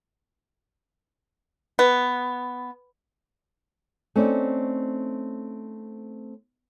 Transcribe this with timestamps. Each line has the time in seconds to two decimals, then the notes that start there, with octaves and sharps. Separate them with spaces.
1.79 B3
4.16 A3 C4 C#4 D#4 D5